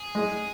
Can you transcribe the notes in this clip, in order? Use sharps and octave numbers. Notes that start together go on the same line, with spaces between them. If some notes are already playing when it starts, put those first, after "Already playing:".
Already playing: G#4
G#3